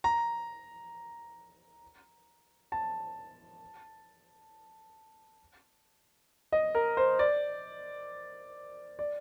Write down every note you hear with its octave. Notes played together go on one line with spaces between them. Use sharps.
A#5
A5
D#5
A#4
C5
D5
D5